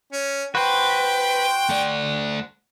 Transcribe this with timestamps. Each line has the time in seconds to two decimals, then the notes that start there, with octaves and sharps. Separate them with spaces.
0.13 C#4
0.55 F#4 B4 C5 G5
1.69 A3 D5